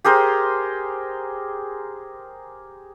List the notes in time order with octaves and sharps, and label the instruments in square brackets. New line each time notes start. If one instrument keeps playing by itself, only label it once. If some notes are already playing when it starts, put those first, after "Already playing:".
[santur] G4 G#4 A#4 C5